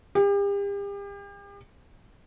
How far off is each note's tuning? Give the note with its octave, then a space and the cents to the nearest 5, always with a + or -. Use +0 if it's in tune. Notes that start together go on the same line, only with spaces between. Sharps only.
G4 +40